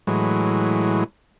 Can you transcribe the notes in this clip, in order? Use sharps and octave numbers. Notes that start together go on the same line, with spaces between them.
A2 E3 F#3 G#3